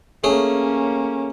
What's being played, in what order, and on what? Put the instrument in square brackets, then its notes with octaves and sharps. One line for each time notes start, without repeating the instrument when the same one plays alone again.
[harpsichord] A3 G#4 C#5 [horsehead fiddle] A#3 C#4